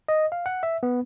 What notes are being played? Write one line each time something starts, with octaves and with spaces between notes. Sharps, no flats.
D#5
F5
F#5
E5
B3